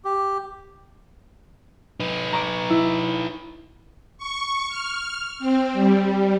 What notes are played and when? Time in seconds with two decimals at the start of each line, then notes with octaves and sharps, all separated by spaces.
0.05 G4
2.00 D#4 B4
2.33 A#5 C#6 D6
2.70 E4
4.18 C#6
4.69 F6
5.39 C4
5.73 G3